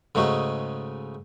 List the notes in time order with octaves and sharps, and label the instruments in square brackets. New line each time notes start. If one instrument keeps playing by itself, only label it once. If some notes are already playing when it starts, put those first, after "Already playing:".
[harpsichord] G#2 C#3 A3 D#4 F#4